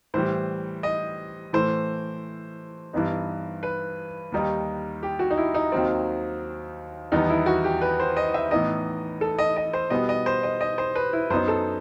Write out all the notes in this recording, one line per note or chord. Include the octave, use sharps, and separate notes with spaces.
A2 E3 G3 C5
D#5
A2 E3 A3 C5
G2 E3 B3 D#4
B4
D#2 D#3 G3 D#4
G4
F#4
D#4
E4
D#4
D#2 D#3 F#3 C4
E2 D#3 G3 B3 D#4
E4
F#4
G4
B4
C5
D#5
E5
A2 E3 B3 D#4 D#5
A4
D#5
D#5
C5
B2 G3 B3 D#5
D#5
C5
D#5
D#5
C5
B4
E4
F#2 F#3 B3 D#4 C5
A4